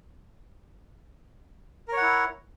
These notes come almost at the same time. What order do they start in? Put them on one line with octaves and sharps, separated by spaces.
A#4 C#5 F#5 E4